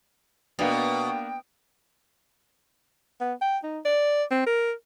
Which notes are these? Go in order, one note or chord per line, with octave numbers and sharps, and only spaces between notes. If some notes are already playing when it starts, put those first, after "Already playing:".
B2 A#3 B3 D4 G5
B3
G5
D#4
D5
C4
A#4